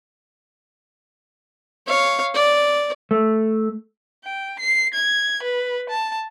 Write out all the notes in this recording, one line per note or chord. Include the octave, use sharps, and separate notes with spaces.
C#5 F5
D5
A3
G5
C7
G#6
B4
A5